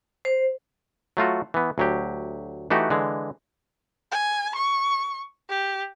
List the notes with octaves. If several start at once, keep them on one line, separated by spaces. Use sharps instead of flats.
C5
F#3 A3 F4 F#4
E3 B3
D2 F#3 G4
E3 A3 D#4 F#4 G4
D3 E3 G#3
G#5
C#6
G4